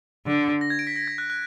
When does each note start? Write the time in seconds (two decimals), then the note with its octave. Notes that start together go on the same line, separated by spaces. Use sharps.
0.27 D3
0.61 A#6
0.70 G#6
0.79 D7
0.87 B6
0.96 A#6
1.08 G#6
1.18 F#6
1.30 F#6